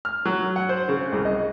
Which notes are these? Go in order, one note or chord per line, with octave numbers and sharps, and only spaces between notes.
F6
F#3
F#5
C5
C#3
C2
D#5